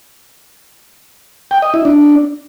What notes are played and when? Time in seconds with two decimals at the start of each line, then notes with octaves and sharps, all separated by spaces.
1.51 G5
1.62 D#5
1.74 E4
1.85 D4